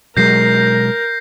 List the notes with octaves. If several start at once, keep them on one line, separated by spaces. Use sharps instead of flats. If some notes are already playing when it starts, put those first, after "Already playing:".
B2 F#3 G#3 A#4 G6 A#6 C7